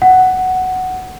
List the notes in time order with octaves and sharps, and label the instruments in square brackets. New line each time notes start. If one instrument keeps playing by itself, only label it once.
[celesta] F#5